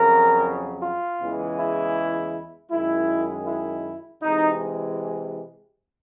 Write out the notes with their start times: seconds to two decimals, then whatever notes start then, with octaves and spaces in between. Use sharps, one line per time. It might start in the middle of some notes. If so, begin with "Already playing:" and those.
Already playing: F2 C#3 F#3 A#4
0.83 F4
1.22 E2 C#3 E3 G#3
1.58 E4
2.71 F#2 D#3 G#3 E4
3.46 E4
4.22 C3 E3 G#3 D#4